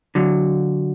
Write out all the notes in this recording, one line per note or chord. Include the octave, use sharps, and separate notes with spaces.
D3 F#3